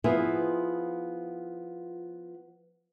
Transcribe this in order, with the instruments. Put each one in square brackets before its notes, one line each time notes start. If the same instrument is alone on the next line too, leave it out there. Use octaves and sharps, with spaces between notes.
[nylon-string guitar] F3 B3 E4 F4 G#4